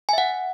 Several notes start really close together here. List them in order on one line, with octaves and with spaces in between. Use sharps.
G#5 E5 F#5